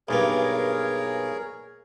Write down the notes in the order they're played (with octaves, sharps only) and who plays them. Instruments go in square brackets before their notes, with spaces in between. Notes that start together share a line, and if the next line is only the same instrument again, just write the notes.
[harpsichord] B1 G2 A#3 [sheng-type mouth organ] G#4 A#4 C#5